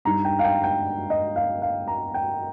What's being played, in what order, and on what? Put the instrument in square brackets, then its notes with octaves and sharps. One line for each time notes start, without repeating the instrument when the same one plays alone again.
[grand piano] G2 G3 D#4 A#5
G5
F5
G5
G5
D#5
F5
F5
A#5
G5